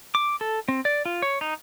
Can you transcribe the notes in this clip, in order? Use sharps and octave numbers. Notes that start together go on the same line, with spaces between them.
D6
A4
C4
D5
F4
C#5
D#4